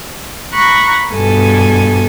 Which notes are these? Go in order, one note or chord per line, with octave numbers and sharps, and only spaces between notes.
A#5 B5 C#6 F#6 A#6
G2 B2 A4 G#5